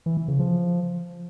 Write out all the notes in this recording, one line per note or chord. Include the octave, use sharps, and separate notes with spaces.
E3
E3
C#3
F3